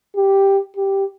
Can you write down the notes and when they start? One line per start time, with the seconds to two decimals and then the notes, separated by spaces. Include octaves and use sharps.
0.16 G4
0.76 G4